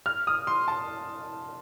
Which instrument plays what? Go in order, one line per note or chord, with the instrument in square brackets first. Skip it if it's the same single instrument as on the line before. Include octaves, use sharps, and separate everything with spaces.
[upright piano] F6
D#6
C6
A5